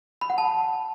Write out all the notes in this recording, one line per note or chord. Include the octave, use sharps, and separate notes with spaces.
B5
F#5
A5